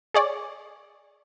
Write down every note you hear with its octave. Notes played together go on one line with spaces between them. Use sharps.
G#4 C#5 D5